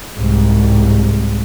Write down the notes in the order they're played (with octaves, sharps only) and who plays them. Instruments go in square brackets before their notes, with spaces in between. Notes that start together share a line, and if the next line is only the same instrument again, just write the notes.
[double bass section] C2 G#2